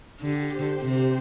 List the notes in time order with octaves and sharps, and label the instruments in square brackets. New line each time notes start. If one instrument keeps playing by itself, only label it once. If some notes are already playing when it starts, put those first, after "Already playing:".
[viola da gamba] D3 [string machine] G4
[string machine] C5
[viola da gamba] C3 [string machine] C5